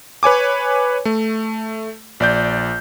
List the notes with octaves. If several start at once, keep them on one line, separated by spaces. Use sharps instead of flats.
B4 C#5 G#5 D6
A3
A#1 D5 G6